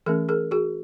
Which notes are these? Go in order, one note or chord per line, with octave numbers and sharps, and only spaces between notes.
E3 A3 C#4 G#4 A#4
G#4 A#4
F#4 G#4